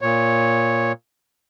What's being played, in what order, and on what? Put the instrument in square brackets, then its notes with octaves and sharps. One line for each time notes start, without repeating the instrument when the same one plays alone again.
[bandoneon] A#2 C#5